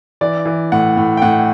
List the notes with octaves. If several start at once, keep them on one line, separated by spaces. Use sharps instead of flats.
E3 D5
E3
A2 F#5
A2
G5
A2 F#5